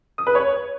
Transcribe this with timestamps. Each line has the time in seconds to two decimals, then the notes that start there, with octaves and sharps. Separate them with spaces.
0.18 D#6
0.27 B4
0.35 C#5